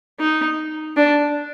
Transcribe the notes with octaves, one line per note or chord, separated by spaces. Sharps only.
D#4
D4